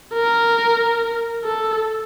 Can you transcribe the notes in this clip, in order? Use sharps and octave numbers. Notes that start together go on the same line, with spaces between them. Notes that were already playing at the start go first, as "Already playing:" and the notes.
A#4
A4